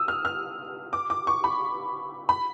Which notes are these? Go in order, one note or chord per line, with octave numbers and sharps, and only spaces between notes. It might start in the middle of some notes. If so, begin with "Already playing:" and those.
Already playing: D#6 E6
F6
F6
D6
D6
C#6
B5
B5